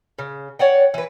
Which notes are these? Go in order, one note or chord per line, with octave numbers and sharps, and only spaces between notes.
C#3
C#5 D5 F#5 G5
E3 B4